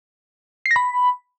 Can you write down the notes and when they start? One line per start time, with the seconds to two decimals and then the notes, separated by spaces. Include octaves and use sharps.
0.66 C7
0.71 A#6
0.76 B5